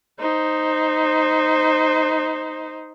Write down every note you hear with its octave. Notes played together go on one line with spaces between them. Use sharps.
D#4 C5